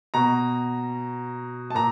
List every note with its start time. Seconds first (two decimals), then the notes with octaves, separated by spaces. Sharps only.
0.14 B2 A#5
1.70 A5
1.75 A#2 A#5